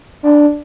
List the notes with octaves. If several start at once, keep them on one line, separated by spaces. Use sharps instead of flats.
D4